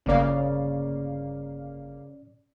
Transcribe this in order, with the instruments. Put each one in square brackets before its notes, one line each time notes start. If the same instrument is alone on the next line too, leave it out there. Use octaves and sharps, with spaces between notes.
[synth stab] G1 A#3 F5 [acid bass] C#3 [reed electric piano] C#4 D5